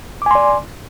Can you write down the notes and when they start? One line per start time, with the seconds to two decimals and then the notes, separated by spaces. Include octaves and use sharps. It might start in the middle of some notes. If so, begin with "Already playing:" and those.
0.22 D6
0.26 G#5
0.31 C6
0.35 D5